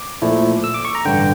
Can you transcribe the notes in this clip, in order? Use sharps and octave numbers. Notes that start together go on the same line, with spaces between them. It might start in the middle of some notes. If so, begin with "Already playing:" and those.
Already playing: D6
A#2 F3 A3 E4
E6
D6
C#6
A#5
A1 G2 D3 G5